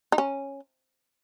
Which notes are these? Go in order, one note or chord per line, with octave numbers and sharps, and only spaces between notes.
D#4
C#4